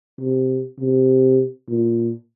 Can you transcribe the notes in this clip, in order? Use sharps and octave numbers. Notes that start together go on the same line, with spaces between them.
C3
C3
A#2